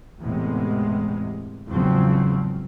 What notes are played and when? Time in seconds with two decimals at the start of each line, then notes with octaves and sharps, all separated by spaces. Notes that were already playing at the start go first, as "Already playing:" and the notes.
0.20 E2 A2 C3 G#3
1.67 E2 G#2 C#3 F3 F#3 C4